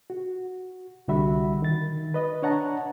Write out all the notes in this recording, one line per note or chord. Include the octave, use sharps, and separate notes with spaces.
F#4
C2 D3 G3 F#4 E5 B5
D#3 A6
B4 D#5
D4 C#5 F#5 A5 A#5